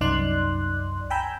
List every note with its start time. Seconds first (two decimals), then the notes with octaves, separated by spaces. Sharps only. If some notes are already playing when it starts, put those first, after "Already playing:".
0.01 C2 F#2 D#4 D5 C6 F#6
1.10 G5 G#5 A#5 B5 E6 G6